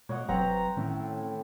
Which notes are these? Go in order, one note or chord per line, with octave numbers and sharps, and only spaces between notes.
B2 A#3 C#5 D#5 F#5
F1 F#3 C4 B4 F#5 A#5
A2 D#3 C#4